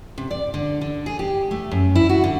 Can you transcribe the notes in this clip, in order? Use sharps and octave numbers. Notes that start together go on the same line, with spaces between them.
C3
D5
D3
D3
G#4
G4
A3
F#2
E4
F#4
D3